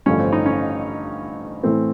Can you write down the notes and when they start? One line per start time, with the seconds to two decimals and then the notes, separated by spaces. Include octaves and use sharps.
0.06 A1 G2 D3 F3 A3 C#4
0.19 C4
0.33 D#4
0.46 C#4
1.63 A2 E3 A3 C4